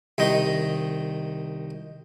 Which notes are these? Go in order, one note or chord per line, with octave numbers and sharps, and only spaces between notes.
C2 D#3 D#4